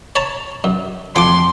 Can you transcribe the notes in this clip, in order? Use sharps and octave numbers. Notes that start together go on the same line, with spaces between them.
C#5 A5 A#5
F#2
F2 F3 C6 D6